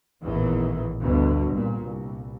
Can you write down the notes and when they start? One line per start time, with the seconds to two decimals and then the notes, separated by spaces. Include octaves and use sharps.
0.23 A1 E2 A#2 D#3 E3
1.01 D2 G2 B2 D3
1.51 C2 A#2
1.82 C2